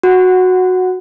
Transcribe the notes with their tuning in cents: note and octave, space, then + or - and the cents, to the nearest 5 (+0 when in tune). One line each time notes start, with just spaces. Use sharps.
F#4 -10 F#5 +0